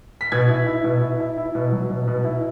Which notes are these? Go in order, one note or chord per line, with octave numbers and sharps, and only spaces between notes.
B6
B2 G#6
E4
E4
B2
E4
E4
E4
B2
F#3
B2
B2
E4